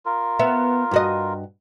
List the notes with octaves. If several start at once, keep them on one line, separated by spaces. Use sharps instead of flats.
F4 A#4
B3 E5
G2 F#4 D#5